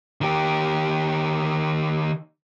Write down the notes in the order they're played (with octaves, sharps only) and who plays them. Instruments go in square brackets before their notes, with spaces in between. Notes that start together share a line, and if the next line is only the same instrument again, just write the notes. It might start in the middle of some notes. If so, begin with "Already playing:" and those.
[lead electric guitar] D#3 G4